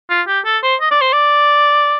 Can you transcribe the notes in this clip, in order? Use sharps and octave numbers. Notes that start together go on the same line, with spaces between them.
F4
G4
A4
C5
D#5
D5
C5
D5